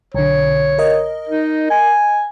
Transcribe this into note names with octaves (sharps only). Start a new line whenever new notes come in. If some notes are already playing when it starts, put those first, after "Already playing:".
B1 D3 C#5
A#4 D#5
D#4
G#5